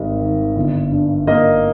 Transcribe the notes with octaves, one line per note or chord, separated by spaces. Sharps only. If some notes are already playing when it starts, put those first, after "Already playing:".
Already playing: G#1 G#2 G3 D#5
D#3
G1
G2
A#3 D#5